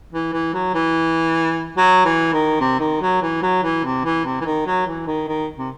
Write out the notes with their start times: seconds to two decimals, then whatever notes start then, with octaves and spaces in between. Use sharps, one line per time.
0.13 E3
0.33 E3
0.54 F#3
0.74 E3
1.77 F#3
2.05 E3
2.33 D#3
2.60 C3
2.80 D#3
3.02 F#3
3.22 E3
3.42 F#3
3.63 E3
3.84 C3
4.05 E3
4.25 C3
4.41 E3
4.45 D#3
4.67 F#3
4.87 E3
5.07 D#3
5.28 D#3
5.58 C3